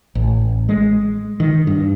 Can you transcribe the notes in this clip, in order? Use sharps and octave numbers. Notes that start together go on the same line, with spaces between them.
A1
G#3
D#3
G2